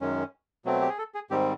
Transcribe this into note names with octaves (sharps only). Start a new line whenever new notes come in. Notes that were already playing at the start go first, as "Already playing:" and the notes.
F#2 D#3 G#3 C#4
B2 F#3 A3 C4
G4
G#4
A4
G#4
G#2 D#3 G3 C4 G4